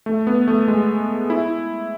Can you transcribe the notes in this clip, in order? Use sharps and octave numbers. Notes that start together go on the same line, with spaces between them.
A3
B3
A3
G#3
E4